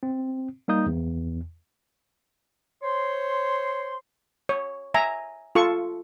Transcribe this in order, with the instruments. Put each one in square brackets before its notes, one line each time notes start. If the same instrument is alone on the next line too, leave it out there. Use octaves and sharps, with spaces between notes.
[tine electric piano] C4
G3 A#3 D#4 D#6 G6
E2
[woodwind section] C5 C#5 C6
[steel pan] C#5
E5 G#5 A#5
F4 A4 C#6